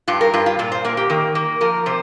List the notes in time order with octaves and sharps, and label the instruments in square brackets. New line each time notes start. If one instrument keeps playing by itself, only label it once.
[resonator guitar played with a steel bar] G2 F4
A#4
G2 F4
F4
A#2 F4
C5
A#3 A#4
G4
D#3 A#4
A#3
F3 A#4
C3 C5